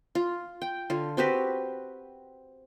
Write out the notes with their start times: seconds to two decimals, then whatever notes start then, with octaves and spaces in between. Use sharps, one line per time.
0.15 F4
0.62 G5
0.90 D3 F4
1.17 C4 F#4 G4 B4